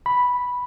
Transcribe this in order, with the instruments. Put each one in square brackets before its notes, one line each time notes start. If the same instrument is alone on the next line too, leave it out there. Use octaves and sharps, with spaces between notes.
[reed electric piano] B5